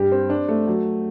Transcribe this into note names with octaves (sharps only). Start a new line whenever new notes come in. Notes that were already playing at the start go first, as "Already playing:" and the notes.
Already playing: G2 G4
C4
D4
A3
F#3